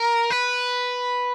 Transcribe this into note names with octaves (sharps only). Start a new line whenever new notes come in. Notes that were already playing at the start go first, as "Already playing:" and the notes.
Already playing: A#4
B4